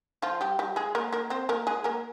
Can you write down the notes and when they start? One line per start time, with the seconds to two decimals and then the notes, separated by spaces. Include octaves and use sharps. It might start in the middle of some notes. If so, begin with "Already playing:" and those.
0.22 F3 F4
0.41 G3 G4
0.59 G3 G4
0.76 G#3 G#4
0.95 A#3 A#4
1.13 A#3 A#4
1.30 C4 C5
1.49 A#3 A#4
1.67 G#3 G#4
1.84 A#3 A#4